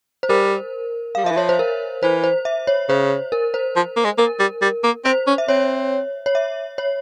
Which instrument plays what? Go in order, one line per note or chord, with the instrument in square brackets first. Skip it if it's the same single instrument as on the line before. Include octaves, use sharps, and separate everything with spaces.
[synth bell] C5
[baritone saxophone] G3 [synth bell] A#4
[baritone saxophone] G3 [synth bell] F5
[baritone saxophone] F3
[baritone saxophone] E3 [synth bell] E5
[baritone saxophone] F3 [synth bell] C#5
[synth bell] C5
A#4
[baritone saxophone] E3 [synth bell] C5
[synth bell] C5
E5
C#5
[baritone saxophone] C#3 [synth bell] C5
[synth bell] A#4
C5
[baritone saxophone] F3
A#3
G#3
[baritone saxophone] A#3 [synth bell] A#4
[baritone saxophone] G3
G3
A#3
[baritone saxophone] C4 [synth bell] C5
[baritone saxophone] C#4
[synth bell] E5
[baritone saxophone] C4 [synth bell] C#5
[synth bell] C#5
E5
C#5